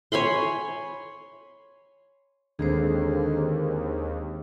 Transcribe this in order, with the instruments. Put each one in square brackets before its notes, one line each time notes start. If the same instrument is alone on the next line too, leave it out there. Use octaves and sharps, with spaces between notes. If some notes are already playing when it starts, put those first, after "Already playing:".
[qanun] C#5 G#5 B5 C6
[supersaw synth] D#2 [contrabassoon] D3 [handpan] D#3 G#3 C4 [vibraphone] G#4 C5